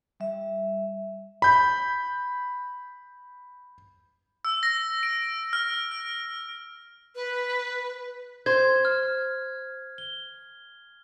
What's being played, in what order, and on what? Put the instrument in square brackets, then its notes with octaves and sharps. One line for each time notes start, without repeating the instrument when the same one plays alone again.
[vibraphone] G3 E5
[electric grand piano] B5 G6
[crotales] E6
A#6
D7
F6
F6
[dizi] B4
[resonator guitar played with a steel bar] C5 [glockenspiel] G#6
[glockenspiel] F6
G7